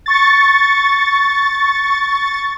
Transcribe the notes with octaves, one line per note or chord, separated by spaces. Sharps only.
C#6 A6